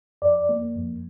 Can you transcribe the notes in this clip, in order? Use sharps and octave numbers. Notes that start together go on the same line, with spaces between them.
F2 D5
A#3
F2